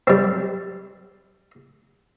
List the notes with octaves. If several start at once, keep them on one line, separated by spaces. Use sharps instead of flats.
G3 C4